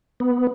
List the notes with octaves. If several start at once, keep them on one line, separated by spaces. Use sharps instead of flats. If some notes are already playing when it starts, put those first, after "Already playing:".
B3